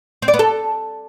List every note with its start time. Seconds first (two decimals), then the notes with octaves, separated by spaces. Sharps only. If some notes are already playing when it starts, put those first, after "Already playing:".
0.22 C4
0.28 D5
0.34 B3
0.39 A4